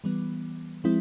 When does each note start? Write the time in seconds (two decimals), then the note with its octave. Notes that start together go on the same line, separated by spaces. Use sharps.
0.04 E3 G3 B3
0.84 F3 G#3 C4 E4